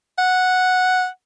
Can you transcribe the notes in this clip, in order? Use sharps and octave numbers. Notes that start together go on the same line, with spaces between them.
F#5